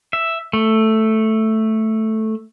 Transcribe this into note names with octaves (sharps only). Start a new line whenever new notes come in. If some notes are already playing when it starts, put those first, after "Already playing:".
E5
A3